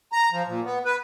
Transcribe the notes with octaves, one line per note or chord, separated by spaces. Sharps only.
A#5
F3
A#2
B3
B4